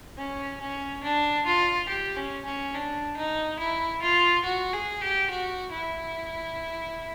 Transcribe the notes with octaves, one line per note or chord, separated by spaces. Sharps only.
C#4
C#4
D4
F4
G4
C#4
C#4
D4
D#4
E4
F4
F#4
G#4
G4
F#4
E4